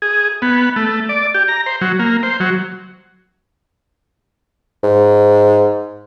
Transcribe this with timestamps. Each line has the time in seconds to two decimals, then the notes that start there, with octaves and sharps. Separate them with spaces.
0.02 G#4
0.42 B3
0.76 A3
1.09 D5
1.34 G4
1.48 A#5
1.66 C5
1.81 F#3
1.99 A#3
2.23 C5
2.40 F#3
4.83 G#2